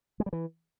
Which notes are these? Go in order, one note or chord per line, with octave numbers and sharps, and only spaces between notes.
G#3
G3
E3